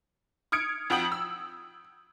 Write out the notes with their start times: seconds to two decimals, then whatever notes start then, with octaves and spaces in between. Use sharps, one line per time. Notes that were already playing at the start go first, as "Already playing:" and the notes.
0.52 D#6 F6 G#6 C#7 D7
0.90 F2 F3 F#4 G5 D#6 F#7
1.12 E6